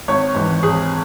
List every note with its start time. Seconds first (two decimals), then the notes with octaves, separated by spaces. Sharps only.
0.08 G#1 C#5
0.35 G#2 E3
0.63 G#1 G#4